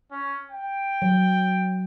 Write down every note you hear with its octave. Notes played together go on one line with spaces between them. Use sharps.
C#4
G5
F#3